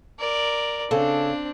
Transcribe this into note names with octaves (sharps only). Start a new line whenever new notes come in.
A#4 D5
C#3 C4 D4 A4